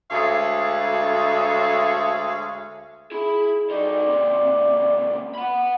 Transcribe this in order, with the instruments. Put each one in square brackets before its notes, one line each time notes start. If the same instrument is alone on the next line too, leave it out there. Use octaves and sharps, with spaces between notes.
[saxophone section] D2 G#3 C#5 E5 F5
[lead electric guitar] E4 B5 [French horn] G#4
[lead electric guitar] F#3 D#4 [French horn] D5
[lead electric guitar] D#2 C3
F#5 B5